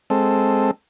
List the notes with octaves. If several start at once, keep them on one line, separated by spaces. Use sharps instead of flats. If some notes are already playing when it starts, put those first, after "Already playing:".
G#3 C4 A4